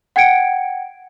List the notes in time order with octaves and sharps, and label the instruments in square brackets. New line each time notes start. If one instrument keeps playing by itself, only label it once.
[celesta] F#5 G5 G#6 C#7 D7